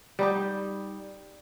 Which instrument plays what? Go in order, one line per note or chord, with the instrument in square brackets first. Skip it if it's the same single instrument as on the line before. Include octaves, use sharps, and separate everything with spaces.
[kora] G3 D#4 G4